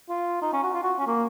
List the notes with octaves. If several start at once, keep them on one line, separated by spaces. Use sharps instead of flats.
F4
D#4
C#4
F#4
F4
F#4
C#4
A#3